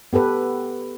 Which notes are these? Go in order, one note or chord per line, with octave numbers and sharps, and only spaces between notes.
B3 G4 A4 B4